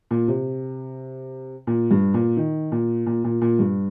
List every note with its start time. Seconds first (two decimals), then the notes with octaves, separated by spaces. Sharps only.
0.11 A#2
0.28 C3
1.67 A#2
1.91 G2
2.14 A#2
2.37 D#3
2.72 A#2
3.06 A#2
3.24 A#2
3.41 A#2
3.59 G2